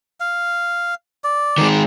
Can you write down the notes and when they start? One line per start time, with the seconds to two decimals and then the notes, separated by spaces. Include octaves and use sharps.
0.20 F5
1.24 D5
1.58 D#3 G#3